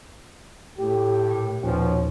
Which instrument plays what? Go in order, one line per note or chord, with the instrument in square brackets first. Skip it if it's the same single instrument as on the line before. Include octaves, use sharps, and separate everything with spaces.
[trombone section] A2 G4
[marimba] A#2
[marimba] D#2 [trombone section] B2 F3 C#4